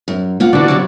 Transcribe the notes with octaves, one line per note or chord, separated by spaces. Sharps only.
F#2
A#3 F4 F#5
A#2 D3 E3 F#4 D5
F2 C3 F#3